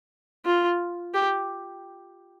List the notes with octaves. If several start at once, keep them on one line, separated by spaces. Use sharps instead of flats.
F4
G4